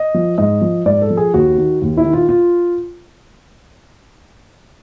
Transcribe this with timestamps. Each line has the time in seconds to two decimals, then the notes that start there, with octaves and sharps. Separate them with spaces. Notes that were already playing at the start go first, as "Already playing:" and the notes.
Already playing: D#5
0.14 F3
0.38 G#2 D#5
0.61 F3
0.85 G#2 D5
1.02 A4
1.10 F3
1.17 G#4
1.34 D#2 F#4
1.58 D#3
1.82 D#2
1.97 E4
2.06 D#3
2.13 F4
2.29 F4